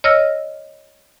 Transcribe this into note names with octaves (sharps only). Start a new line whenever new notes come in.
C#5 D#5 E6 F6 A#6